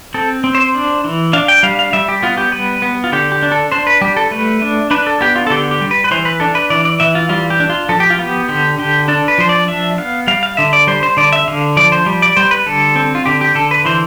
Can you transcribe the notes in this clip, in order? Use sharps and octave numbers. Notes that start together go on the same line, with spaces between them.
C4 A4
C4
C5
D4
E3
D4 F5
G5
G3 F5
F5
G3 E5
G4
B3 F4
G4
G3 B4
B3
F4
D3 G4
G4
D4
A4
D4 C5
B4
G3 G4
A4
A3 B4
D4
D4 B4
A4
B3 G4
F4
A4
D3 G4
G4
G3
B4
B4
E3 C5
B4
D4 A4
B4
E3 D5
D5
E3 E5
F4
G3 F4
G4
D4
F4
F3 A4
G4
F4
B3 G4
D3 G4
D3 G4
D4 A4
B4
F3 C5
D5
D4 E5
B3 F5
G3 F5
F5
D3 E5
D5
G3 C5
C5
D3 D5
E5
D3 F5
F3 D5
C5
G3
D5
G3 C5
B4
D3 A4
C4
F4
D3 G4
G4
D3 A4
B4
E3 C5